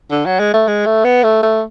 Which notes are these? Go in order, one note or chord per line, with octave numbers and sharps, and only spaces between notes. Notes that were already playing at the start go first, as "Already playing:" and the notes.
D3
F#3
G#3
A3
G#3
A3
B3
A3
A3